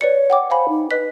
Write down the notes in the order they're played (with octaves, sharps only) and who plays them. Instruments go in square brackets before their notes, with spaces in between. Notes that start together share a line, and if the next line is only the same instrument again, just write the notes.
[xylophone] B4 D5 C#7 [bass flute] C#5
[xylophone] F#5 G5 D6
[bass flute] C5 [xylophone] F5 G#5 B5
[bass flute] D#4
[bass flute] B4 [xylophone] D#5 F#6 B6